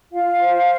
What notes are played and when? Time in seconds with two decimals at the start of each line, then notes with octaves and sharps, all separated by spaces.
0.12 F4 F5
0.41 C5